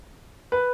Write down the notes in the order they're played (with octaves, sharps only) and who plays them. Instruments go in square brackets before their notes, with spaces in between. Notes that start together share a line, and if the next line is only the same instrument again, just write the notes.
[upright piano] B4